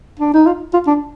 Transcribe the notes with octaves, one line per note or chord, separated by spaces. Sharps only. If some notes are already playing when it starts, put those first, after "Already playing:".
D4
D#4
F4
F4
D4